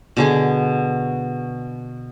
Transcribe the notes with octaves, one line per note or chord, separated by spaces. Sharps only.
B2 D3 G#4